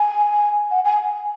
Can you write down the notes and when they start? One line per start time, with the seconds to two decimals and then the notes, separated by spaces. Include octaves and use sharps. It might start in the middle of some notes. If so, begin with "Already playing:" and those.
Already playing: G#5
0.71 F#5
0.85 G#5